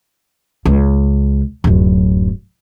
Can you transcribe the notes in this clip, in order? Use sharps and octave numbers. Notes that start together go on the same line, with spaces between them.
C#2
D1 F#2